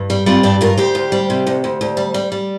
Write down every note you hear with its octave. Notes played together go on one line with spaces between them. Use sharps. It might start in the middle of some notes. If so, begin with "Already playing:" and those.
Already playing: G2
G3
G3 C4 F4
G2 D4 G4
G2 F4 A#4
D2 G4 C5
D2
G3
C3
D2
D2
D2
G3
G3
G3